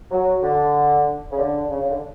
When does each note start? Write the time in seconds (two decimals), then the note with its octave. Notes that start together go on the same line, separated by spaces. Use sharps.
0.11 F#3
0.43 D3
1.31 C#3
1.38 D3
1.70 C#3
1.80 C#3
1.90 D3